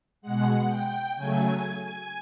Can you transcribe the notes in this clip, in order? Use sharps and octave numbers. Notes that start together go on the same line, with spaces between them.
B2 G#3 F#5
G5
C#3 F#3 A3 G#5